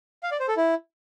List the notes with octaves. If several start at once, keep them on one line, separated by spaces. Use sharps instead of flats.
F5
D5
C5
A4
E4